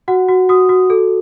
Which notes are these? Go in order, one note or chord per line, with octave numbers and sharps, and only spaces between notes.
F#4 F#5
F#4
F#4 D#6
F#4
A4